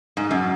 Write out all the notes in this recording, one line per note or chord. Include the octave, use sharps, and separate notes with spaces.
G#2
F#2